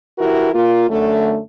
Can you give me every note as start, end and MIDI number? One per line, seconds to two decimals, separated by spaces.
0.18 0.49 52
0.18 0.49 64
0.18 0.49 66
0.18 0.49 67
0.18 0.49 70
0.53 0.87 58
0.53 0.87 65
0.89 1.38 42
0.89 1.38 50
0.89 1.38 57